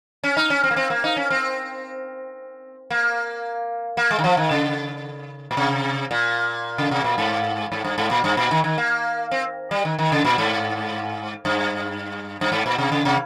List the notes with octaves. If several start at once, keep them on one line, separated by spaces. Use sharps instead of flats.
C#4
D#4
C#4
C4
A#3
C4
A#3
D#4
C#4
C4
A#3
A#3
G#3
D#3
F3
D#3
C#3
A#2
C3
A#2
C#3
C3
A#2
G#2
G#2
G2
G#2
A#2
G2
A#2
D#3
D#3
A#3
C4
G3
D#3
D#3
C#3
A#2
G#2
G2
G2
G#2
A#2
C3
C#3
C3